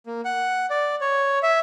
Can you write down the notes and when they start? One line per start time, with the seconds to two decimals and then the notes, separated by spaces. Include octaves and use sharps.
0.07 A#3
0.25 F#5
0.70 D5
1.01 C#5
1.43 E5